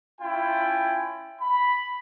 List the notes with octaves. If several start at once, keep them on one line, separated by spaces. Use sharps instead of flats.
C#4 E4 F4 G5
B5